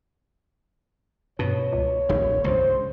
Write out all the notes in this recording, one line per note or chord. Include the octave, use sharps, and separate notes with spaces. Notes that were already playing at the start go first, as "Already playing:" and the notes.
G2 B2 C#5
C#2
D#1 B1
C#2 G2 C5